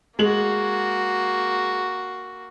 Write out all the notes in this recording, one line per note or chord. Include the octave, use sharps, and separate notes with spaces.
G#3 A#3 F#4 F#7